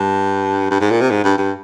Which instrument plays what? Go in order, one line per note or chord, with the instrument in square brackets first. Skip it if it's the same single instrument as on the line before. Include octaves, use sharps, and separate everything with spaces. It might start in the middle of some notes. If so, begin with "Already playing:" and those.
Already playing: [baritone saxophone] G2
G2
G#2
A#2
C3
G#2
G2
G2